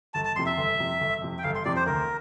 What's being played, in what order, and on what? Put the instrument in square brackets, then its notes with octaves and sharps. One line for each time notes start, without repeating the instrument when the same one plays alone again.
[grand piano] G1 [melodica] A5
[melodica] A5
[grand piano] F2 [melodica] C6
[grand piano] C3
[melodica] E5
[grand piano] G1
F2 C3
G1
F2 C3
[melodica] G5
[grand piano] G1 [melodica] F5
[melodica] C6
[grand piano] F2 C3 [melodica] D5
[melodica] C5
[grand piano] D2 [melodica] A#4